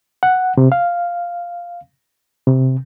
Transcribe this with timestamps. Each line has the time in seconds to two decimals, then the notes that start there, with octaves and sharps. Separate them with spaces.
0.23 F#5
0.57 C3
0.72 F5
2.47 C3